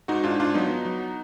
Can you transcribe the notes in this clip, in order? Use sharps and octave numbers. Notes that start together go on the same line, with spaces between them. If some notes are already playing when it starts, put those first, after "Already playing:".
G#2 D#4 F#4
G#2 D4 F4
G#2 D4 F4
F#3 B3 D#4
F#3
F#3